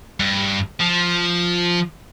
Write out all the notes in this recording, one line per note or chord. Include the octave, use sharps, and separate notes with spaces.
G2
F3